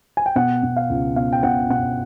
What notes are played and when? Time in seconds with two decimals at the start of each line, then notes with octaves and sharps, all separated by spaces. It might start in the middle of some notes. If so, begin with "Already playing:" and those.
0.17 G#5
0.26 G5
0.36 B2 F#5
0.63 B2
0.77 F5
0.90 C#2
1.16 B2 F5
1.33 G5
1.43 B2 F#5
1.70 B2 F#5